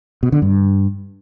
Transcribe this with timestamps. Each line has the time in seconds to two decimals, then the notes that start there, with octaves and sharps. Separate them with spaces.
0.23 B2
0.32 D3
0.42 G2